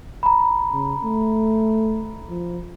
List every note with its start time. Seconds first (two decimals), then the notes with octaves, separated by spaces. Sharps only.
0.23 A#5 B5
0.72 C#3
1.04 A3
2.28 F3